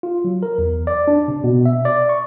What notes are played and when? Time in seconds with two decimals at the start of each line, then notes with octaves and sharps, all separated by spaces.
0.03 F4
0.25 F#3
0.43 A#4
0.58 E2
0.87 D5
1.08 D4
1.28 C3
1.44 B2
1.66 E5
1.85 D5
2.09 C#6